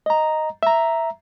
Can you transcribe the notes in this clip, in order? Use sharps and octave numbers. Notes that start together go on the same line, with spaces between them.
D#5 A#5
E5 A#5